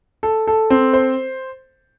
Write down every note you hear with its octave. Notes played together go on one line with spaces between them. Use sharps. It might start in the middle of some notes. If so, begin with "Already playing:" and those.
A4
A4
C4
C5